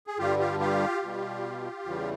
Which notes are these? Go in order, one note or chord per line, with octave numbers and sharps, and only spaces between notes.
G#4
G2 D3 G3 F4 G4
F4 G4
F4 G4
B2 G3
E2 C#3 E3 G3